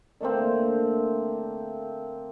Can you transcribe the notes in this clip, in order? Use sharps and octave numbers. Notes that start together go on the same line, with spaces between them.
D3 A3 A#3 C4